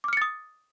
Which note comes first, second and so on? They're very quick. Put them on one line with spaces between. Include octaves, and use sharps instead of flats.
D6 F6 C#7 A6 D#6